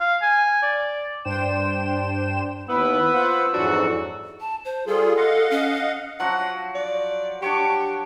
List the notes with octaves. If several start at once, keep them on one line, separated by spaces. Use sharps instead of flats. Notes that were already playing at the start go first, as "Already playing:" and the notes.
F5
G#5
D5
G2 D4 C5 G5 E7
D#2 B3 E4 B4 E6
F4 C5 F#5
F2 G#2 E3 F#3 D4 F#4
A5
C5
G3 F4 G#4 A4
D#5 F5 F#5
C#4
F3 F#3 F#4 F#5
D5
D4 G4 C#5 C#6